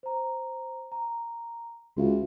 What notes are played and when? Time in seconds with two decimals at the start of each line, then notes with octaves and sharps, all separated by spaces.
0.03 C5 A#5
0.92 A#5
1.97 C#2 F#4 E5 F5